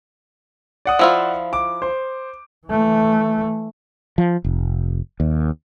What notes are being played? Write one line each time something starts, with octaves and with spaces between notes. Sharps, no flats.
D5 F#5 D#6
F3 E4 F4
D6
C5
E3 A3
F3
F1
D#2